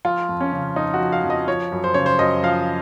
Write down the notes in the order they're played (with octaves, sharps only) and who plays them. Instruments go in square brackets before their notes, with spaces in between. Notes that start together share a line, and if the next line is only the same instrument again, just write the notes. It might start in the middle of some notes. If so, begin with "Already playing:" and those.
[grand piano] F3 F4
F2
C#4
C#3
F2 D#4
F#4
F3
F5
F2
D#5
F3 C#5
F#2
C5
C#3 C#5
C5
F#2 D#5
F3 F5